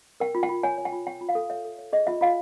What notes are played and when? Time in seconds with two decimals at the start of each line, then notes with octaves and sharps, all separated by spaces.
0.20 A#4 G5
0.35 F4
0.43 G5
0.49 F4
0.63 C#5 G#5
0.78 C#5
0.85 G5
0.93 F4
1.07 C#5 G5
1.21 F4
1.29 F5
1.35 A4
1.50 C#5 E5
1.65 A4
1.78 C#5
1.93 G#4 D#5
2.07 F4 E5
2.21 F4 F5